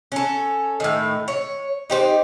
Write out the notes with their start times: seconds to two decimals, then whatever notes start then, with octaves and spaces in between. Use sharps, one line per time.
0.12 C#4 A4
0.80 A2 D#3
1.28 C#5
1.90 D#4 G4 C5